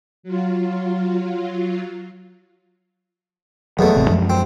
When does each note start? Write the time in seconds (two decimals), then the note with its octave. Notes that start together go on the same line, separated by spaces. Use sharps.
0.23 F#3 F4
3.79 E2 B2 F#3 A3
3.96 G#1 C3
4.10 F#2 F3 G#3
4.30 C4